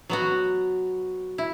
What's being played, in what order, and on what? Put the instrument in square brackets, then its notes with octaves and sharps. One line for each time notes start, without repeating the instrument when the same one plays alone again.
[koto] F#3 B3 F#4
E4